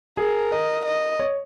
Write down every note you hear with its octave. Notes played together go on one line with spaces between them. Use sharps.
G#4 A#4
A#4 D#5
D#5
C#5